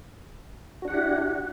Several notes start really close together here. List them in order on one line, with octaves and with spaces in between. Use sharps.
F#4 D4 F#5 G4 E4